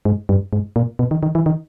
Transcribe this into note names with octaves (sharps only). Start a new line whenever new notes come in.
G#2
G2
G#2
A#2
B2
D#3
D#3
E3
D#3